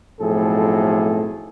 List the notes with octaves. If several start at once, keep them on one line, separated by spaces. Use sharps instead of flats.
B1 A2 F3 C4 G#4 A4